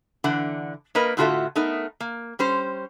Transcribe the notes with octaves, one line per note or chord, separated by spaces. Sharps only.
D3 E3 D4 F#5
A#3 A#4 B4 D#5
A2 D3 F4 F#4 A4 E5
A3 B3 D#4 A#4
A#3
G3 C#4 C5